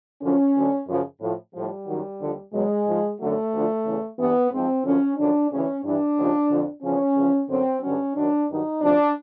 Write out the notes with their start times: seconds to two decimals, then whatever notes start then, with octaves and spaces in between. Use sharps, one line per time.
0.22 F#2 D3 F3 C#4
0.55 D2 D3 F#3
0.87 F#2 C#3 F3
1.21 A2 F3
1.54 A2 F3 G3
1.87 F#2 D#3 F#3
2.20 D#2 D3 F3
2.53 E2 B2 F#3 G#3
2.86 G#2 F3
3.19 F#2 D3 F#3 A3
3.52 D2 D3 F3
3.85 E2 C#3 E3
4.18 G2 E3 B3
4.52 G#2 F3 C4
4.84 F#2 D3 F3 C#4
5.18 F#2 D3 F3 D4
5.51 D2 C#3 E3 C#4
5.84 G2 E3 D4
6.17 D#2 C#3 F3
6.50 F2 D3 F3
6.83 E2 C#3 F3 C#4
7.16 E2 C#3 F3
7.49 F#2 D3 F#3 C4
7.82 G2 D3 F#3 C#4
8.15 F#2 D#3 F#3 D4
8.49 G2 D#3 F#3 D#4
8.82 D2 C3 F3 D4